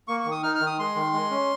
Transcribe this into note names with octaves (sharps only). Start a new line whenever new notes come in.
A#3 C#6
C#6
D#3
D#6
D#4 F6
F6
D#3
D#6
G#3 C6
D#3
G#3
C#4